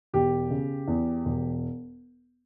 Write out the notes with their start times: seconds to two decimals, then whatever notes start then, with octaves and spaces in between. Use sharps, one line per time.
0.13 E1 G4
0.50 C#3
0.88 E2
1.25 E1